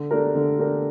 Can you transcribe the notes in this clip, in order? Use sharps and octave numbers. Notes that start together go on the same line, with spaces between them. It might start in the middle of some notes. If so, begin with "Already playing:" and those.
Already playing: D3
A3 D4 G4 A#4
D3
A3 D4 G4 A#4